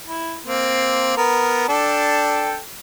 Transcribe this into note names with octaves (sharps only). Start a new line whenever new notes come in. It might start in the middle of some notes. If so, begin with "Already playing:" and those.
E4
A#3 C4
B3 A#4
D4 A4 G5